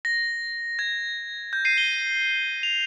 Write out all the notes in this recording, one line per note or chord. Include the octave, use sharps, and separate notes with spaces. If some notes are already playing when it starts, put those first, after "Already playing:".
A#6
G#6
G6
C7 D#7
D#7 G7
F7